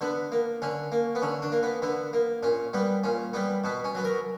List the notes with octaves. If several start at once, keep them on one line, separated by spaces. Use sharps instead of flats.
D3 B3
A#3
D3 C#4
A#3
B3
D3 C#4
D4
A#3
B3
D3 B3
A#3
A#2 C#4
G3 B3
A#2 C#4
G3 B3
B2 B3
C#4
F#3 B3
A#4